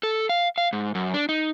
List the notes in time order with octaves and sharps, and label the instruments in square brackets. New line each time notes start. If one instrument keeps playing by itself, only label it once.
[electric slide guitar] A4
F5
F5
G#2
F#2
D4
D#4